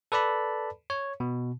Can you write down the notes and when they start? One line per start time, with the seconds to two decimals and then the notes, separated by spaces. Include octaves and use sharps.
0.12 A4 B4 D5 A5 B5
0.90 C#5
1.20 B2